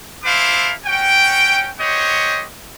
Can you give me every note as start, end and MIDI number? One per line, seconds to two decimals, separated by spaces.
0.24 0.72 64
0.24 0.72 69
0.24 0.72 72
0.24 0.72 77
0.24 0.72 86
0.86 1.69 61
0.86 1.69 66
0.86 1.69 79
1.79 2.43 67
1.79 2.43 72
1.79 2.43 73
1.79 2.43 75
1.79 2.43 78